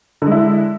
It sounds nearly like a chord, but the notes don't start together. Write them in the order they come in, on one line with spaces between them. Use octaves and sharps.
D3 G#3 E4